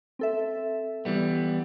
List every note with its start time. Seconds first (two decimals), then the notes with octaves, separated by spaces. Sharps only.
0.19 C4 A4 E5
1.05 E3 G3 B3